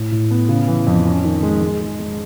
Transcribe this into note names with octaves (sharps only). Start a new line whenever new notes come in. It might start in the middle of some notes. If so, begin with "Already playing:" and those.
Already playing: A2
A2
B3
C#3
E3
F2
C#4
D#3
G#3
G#3
G#3
G#3